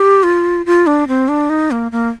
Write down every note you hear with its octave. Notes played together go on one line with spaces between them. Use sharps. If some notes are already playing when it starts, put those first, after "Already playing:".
Already playing: G4
F4
F4
D4
C4
D4
D#4
A#3
A#3